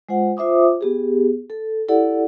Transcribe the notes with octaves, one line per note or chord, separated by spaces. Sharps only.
G#3 F4 C5 F#5
F4 C5 E5 D6 D#6
B3 G4 G#4
A4
E4 G4 A4 D5 F#5